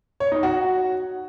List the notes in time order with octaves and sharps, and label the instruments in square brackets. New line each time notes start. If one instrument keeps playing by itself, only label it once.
[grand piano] C#5
D#4
F#4